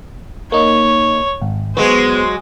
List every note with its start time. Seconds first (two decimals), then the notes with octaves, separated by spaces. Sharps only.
0.52 A#3 D#4 C#5
1.42 G#1
1.77 F#3 G#3 B3 G#4 C5